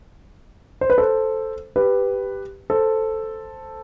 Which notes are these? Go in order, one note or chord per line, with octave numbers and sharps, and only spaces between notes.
C5
B4
A4 C5
G4 B4
A4 C5